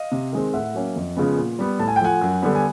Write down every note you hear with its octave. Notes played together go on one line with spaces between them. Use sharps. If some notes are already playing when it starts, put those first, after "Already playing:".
Already playing: D#5 F5
C3
D#3 G#3 C4
A2 E5 F#5
F#3 A#3 C#4
F2
C#3 F3 G#3 B3
A#2
G3 B3
A2 A5
G#5
G5
F3 A3 F#5 G#5
F#2
D3 G3 B3
G#5